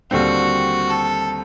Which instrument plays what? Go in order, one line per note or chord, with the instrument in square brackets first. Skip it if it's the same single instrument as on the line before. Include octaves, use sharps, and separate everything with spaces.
[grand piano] D#2 D3 G3 C4 [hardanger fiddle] F#4
[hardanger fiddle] A4